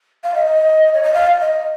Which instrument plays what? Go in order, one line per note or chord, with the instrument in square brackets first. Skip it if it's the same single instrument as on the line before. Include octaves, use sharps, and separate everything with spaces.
[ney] F5
D#5
C#5
D#5
F5
D#5